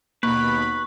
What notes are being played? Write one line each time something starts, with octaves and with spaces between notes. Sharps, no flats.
D#2 B2 A#3 B4 B5 C#6